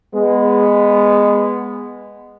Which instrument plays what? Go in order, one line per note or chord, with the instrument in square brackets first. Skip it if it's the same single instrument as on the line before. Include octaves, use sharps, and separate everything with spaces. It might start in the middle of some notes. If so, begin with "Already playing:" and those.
[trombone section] G#3 B3